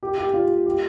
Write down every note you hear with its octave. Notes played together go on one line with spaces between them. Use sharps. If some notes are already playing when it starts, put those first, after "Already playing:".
G4
G4
F4
G4